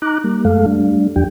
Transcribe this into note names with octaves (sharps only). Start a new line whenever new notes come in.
D#4 A#5 D6 F#6
G3 A#3
F#2 G#3 A3 A4 F5
G3 A3 D4
E2 F3 D4 G4 G5